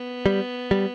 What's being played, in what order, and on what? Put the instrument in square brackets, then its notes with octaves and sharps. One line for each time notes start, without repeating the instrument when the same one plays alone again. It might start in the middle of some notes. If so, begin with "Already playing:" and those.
Already playing: [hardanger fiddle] B3
[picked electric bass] G3
G3